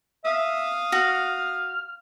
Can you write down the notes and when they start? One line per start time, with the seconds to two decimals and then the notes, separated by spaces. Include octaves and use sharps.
0.24 E5 F5 D#6
0.92 F#4 F6